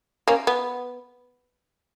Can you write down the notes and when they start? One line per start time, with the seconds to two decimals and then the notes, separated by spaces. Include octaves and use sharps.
0.28 A#3 C#4
0.47 B3